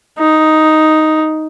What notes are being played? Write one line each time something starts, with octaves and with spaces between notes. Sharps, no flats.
D#4